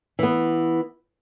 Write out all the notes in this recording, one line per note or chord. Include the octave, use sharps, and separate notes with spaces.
E3 B3